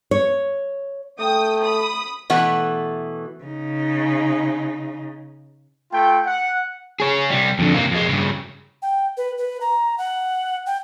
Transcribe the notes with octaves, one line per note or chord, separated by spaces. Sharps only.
C#5
A3 G5 D#6
B5 D#6
B2 E3 A3 F#5
C#3 D#4
A3 F4 G5
F#5
G#4 C#5
C3 G3
F2 D3
C3 A#3
F2 G#3
G2 C#3
G5
B4
B4
A#5
F#5
G5